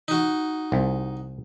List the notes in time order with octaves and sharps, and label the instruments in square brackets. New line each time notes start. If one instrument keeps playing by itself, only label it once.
[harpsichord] D#4 F#4
[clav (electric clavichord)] C2